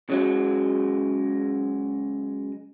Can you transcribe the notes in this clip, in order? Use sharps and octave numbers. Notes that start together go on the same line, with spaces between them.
C#3 F#3 G#3